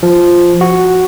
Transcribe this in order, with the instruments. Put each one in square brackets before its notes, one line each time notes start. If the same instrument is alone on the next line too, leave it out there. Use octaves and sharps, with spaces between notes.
[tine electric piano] F3
F#4